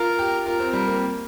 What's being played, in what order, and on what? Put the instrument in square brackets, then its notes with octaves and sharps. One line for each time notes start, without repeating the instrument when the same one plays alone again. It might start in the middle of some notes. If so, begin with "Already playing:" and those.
Already playing: [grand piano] F4 [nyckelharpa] A#4
[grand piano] G4
[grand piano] F4 [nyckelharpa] A#4
[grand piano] C4
G3
A#3